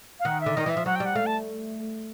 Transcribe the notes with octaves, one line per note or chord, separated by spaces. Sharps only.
F5
D#3 F#5
E5
D3
D#3 D#5
E3 E5
F3
F#3 F#5
G3 G5
F#5
A3 F5
A5